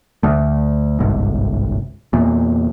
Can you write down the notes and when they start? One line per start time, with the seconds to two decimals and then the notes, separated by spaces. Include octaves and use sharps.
0.23 D2 A3
1.00 G1 C2 G#2
2.13 E2 A#2